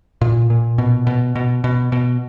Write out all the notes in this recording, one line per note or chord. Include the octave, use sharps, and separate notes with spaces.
A#2
A#2
B2
B2
B2
B2
B2